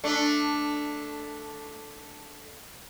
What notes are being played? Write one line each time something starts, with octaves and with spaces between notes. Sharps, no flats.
A3 D4